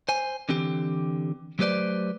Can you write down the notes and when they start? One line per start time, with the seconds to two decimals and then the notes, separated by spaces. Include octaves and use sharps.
0.09 C5 G#5
0.49 D3 E3 C4 G4
1.59 F#3 A3 G4 B4 C5 D5